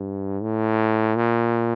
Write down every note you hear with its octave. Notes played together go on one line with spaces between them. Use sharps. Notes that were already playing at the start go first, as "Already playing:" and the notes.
Already playing: G2
A2
A#2